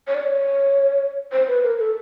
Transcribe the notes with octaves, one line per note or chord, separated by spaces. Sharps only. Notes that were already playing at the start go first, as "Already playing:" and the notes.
C#5
D5
C#5
C5
B4
A#4
A4